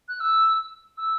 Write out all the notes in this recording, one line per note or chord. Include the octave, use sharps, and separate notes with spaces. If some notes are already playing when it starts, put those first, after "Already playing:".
F#6
E6
E6